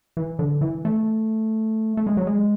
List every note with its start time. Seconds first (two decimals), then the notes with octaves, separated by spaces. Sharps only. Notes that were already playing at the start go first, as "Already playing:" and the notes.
0.17 E3
0.39 D3
0.61 E3
0.85 A3
1.97 A3
2.07 G#3
2.17 F#3
2.27 G#3